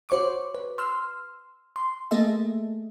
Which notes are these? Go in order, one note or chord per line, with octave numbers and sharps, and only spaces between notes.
F#4 C5 C#5 C#6 D6
B4
C6 E6 F6
C6
A3 A#3 G#4 A4 D#5 E5